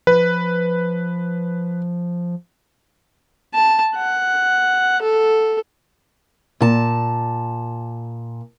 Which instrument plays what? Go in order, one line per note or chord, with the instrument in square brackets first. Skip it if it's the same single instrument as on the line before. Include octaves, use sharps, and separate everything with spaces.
[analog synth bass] F3 [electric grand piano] B4
[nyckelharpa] A5
F#5
A4
[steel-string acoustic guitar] A#2 A5